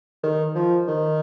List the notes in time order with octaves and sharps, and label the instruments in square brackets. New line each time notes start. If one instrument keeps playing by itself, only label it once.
[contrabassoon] D#3
F3
D#3